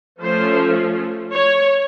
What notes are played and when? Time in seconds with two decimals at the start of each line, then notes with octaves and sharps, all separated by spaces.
0.21 F3 A3 C#4 C5
1.32 C#5